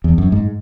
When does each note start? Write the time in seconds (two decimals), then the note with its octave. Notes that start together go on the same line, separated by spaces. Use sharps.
0.04 E2
0.18 F#2
0.32 G#2